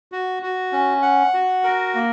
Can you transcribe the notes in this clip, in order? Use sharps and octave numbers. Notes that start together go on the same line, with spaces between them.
F#4
F#4
C#4
F#5
F#4
A#4
A#3